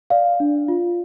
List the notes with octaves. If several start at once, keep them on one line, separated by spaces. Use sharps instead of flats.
D5 F5
D4
F4